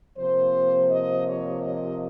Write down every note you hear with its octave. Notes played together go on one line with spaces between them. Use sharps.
C3 F3 A#3 C5
D#5
C#5
D#5